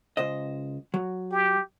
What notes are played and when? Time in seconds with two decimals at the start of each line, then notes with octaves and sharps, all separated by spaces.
0.17 C#2 C5 D#5
0.94 F#3
1.32 G4